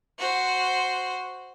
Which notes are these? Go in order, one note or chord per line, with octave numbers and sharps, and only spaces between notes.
F#4 C5